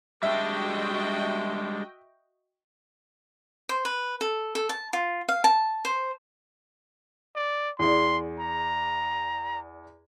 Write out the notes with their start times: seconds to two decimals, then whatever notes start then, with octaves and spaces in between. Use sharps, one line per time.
0.23 G3 G#3 D4 F#4 D#5 E5 G5
3.69 C5
3.85 B4
4.21 A4
4.55 A4
4.69 A5
4.93 F4
5.29 F5
5.44 A5
5.85 C5
7.36 D5
7.79 E2 G#4 D5 C6
8.40 A#5